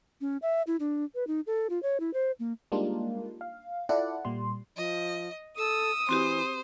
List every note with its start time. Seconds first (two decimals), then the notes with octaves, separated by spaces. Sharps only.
0.21 C#4
0.42 E5
0.67 E4
0.80 D4
1.15 B4
1.27 D#4
1.47 A4
1.70 F4
1.83 C#5
2.00 E4
2.13 C5
2.39 A#3
2.72 G3 G#3 A#3 D4 D#4 F4
3.41 F5
3.89 E4 F4 A4 D5 F#5
4.25 A#2 G3 C6
4.77 F3 D#5
5.58 A4 D#6 E6
6.09 E3 C4 F#4 G4 C5